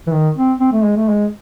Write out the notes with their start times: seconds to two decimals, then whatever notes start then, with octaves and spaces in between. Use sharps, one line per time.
0.07 E3
0.12 D#3
0.37 C4
0.60 C4
0.73 A3
0.84 G#3
0.97 A3
1.09 G#3